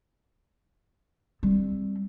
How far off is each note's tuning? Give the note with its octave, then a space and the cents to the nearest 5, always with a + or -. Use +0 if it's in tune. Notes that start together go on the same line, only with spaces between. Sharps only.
G3 +15 C4 +10